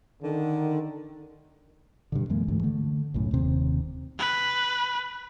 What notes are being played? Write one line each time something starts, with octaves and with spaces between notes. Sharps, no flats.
D3 D#3
G2 B2 D3
F#2 E3 G#3 A#3
D2 G#2 E3 A3
D3 A3
B1 F#2 A2
D#1 D#2 C3
B4